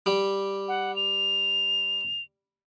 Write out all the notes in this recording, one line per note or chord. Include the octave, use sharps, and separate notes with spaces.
G3 G4
F#5
F7